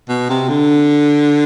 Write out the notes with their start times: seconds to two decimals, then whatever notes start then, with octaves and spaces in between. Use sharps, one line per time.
0.09 B2
0.30 C3
0.49 D3